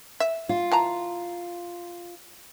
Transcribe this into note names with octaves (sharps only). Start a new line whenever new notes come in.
E5
F4
E3 A5 A#5